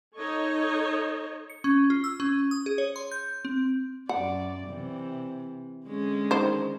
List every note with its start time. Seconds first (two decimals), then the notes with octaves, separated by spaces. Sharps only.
0.17 D#4 A4 C#5 D#5
1.50 C#7
1.64 C#4
1.90 F4
2.04 E6
2.20 C#4
2.51 D#6
2.66 G#4
2.78 C#5
2.96 C6
3.11 G6
3.45 C4
4.09 F#2 D5 F#5
4.67 C3 E3
5.86 D3 G#3 C#4
6.31 D#3 C5